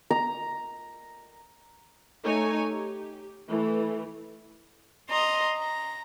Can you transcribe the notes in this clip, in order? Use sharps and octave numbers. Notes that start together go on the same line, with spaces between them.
A#5
A3 D#4 C#5 G#5
G4
E3 A3
D#5 A#5 C6
A#5